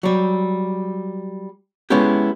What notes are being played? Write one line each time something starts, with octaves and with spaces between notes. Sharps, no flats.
F#3 G3
G#3 B3 C#4 E4 G4